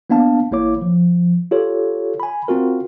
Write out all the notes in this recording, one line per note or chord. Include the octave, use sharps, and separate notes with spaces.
A#3 B3 D4 F5 A5
A1 A#3 E4 C#5 D6
F3
F4 G4 A4 C#5
G#5 B5
C4 F4 F#4 A#4